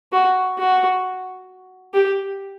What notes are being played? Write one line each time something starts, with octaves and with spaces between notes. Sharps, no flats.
F#4
F#4
G4